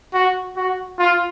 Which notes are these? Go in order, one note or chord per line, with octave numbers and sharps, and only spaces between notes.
F#4
F#4
F4